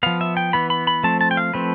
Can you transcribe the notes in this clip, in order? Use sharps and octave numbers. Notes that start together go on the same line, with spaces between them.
F3 B3 F5
E5
G5
E3 B3 B5
B5
B5
F3 A3 C4 A5
A5
G5
F5
F3 A3 C4 B4